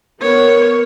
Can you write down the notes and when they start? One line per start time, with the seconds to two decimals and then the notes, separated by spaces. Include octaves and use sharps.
0.22 B3 A#4 C#5